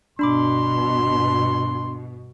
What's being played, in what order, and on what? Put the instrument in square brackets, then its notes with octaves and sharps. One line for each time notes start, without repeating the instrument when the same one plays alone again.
[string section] G1 B2 [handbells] D4 B5 D6 [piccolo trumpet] C6